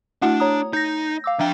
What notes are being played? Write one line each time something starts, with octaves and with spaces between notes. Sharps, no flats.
A3 D4 E4 F#4 F#5
C#5 A#5 D#6
D#4 G6 A#6
F5 D6 E6
F3 D4 E5 G5